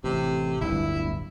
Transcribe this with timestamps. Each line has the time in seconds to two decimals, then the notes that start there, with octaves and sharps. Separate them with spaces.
0.04 A1 C3
0.61 D1 G1 G2 E4